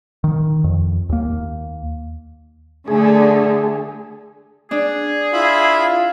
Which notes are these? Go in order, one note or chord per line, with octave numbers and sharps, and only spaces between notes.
D#3
F2
D#2 A#3
D3 A3 G#4
D4 G#4
E4 F4 E5 B5